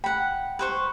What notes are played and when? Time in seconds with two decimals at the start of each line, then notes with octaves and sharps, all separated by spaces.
0.04 F#5 G5 B5
0.59 B4 C5 C#6